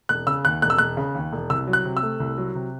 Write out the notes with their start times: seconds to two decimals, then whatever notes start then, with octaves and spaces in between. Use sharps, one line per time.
0.09 E1 F#6
0.27 C#3 E6
0.45 D#2 F#6
0.62 E1 F#6
0.70 E6
0.78 E1 F#6
0.97 C#3
1.15 D#2
1.33 E1
1.50 C2 E6
1.67 F#3
1.73 F#6
1.85 C3
1.97 E6
2.03 A3
2.20 C2
2.38 F#3
2.55 C3